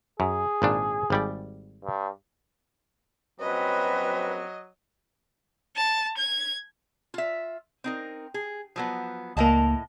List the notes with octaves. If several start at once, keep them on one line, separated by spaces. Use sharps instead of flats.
F#2 G#4
G#1 A#2 D4
G#1 G3 D5
G2
A#1 F#2 F#3 C4 B4 D#5
A5
G#6
F4 E5
C4 D#4 A#4
G#4
F3 F#3 B3
C#2 A2 A#3 D#5 A5